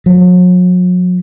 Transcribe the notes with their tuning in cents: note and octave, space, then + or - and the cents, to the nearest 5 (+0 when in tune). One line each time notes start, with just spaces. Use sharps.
F#3 -40